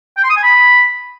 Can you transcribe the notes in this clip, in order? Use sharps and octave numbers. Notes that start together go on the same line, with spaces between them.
G5
C6
D#6
G#5
B5